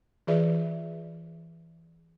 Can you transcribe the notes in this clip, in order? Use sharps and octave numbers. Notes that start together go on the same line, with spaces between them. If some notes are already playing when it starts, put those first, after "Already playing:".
E3 F4 G#4 B4 D5 E5